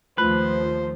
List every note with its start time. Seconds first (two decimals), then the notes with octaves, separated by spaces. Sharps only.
0.18 D#2 F3 A3 F4 B4 C5